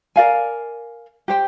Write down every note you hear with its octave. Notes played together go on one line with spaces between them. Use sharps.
A#4 D5 F5 G#5
G4 C5 G5